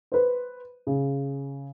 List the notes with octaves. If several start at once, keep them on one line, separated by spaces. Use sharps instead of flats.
B4 C5
C#3